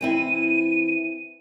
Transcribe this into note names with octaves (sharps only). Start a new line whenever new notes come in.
E3 C4 E4 D#7